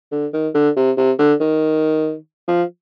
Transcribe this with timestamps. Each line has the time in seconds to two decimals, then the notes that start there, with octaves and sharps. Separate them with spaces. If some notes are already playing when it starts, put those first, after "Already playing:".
0.12 D3
0.34 D#3
0.54 D3
0.76 C3
0.97 C3
1.19 D3
1.40 D#3
2.48 F3